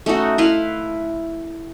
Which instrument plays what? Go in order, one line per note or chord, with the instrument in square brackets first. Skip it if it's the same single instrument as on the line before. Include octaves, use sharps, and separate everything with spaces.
[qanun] A3 C#4 D#4 F#4
E4 B4 F5 C6